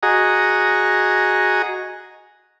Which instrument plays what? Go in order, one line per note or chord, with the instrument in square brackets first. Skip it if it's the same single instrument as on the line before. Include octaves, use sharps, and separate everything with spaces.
[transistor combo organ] F#4 G#4 D#5 A#5